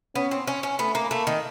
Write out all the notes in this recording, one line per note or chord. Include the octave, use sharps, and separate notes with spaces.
B3 C#4
C4
C#4
C#4
A3 B3
A#3
A3 A#3
D#3